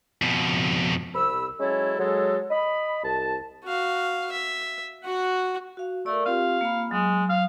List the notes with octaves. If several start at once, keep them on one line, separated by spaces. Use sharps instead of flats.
F2 B2
C2 C3 B5 E6
F#3 G#3 C#4 E4 A4 C#5
F#3 G#3 A4
D#5 B5
C2 A5
F#4 F5
E5
F#4 F#5
F#4 F5
A3 A#4 D5
C4 F4 G4 F5
A#3 B5
F#3 G#3
F5